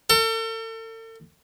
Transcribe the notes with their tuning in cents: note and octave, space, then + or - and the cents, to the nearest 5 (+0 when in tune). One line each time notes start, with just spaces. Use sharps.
A4 +40